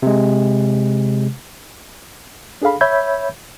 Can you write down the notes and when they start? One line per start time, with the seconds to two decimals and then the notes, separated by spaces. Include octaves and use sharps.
0.03 C3 G#3
2.62 D4 G#4 A4 F5 B5
2.81 C#5 E5 B5 E6 G6 G#6